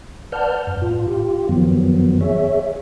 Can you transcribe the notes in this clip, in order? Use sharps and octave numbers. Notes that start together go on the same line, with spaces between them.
B4 D5 F#5 A5 F6 G6
F#2
A2 F4
F4 G4
F#2 D#3 F3 F#3 B3
G#4 C#5 E5